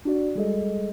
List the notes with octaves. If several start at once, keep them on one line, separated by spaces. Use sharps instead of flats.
D4 F#4 D5
G3 G#3 G#4 A4 D#5